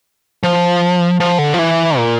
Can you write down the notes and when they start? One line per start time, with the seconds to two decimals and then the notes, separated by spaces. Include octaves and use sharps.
0.43 F3
1.20 F3
1.39 D3
1.54 F3
1.59 E3
1.97 A#2